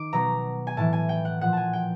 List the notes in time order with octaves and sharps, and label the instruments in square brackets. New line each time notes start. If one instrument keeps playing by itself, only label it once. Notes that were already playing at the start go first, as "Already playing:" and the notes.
Already playing: [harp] D#3 D6
B2 F#3 A#5
G#5
A2 E3 A5
G#5
G5
F#5
A#2 F3 F#5
G#5 A5
G5